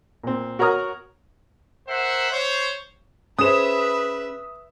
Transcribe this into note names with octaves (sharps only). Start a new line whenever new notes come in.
A#2 C4
F#4 A#4 C#5 A#5 D#6 F6
A#4 C5 E5 F#5
C5 C#5
C#4 G#4 B4 C5 E5 D#6 E7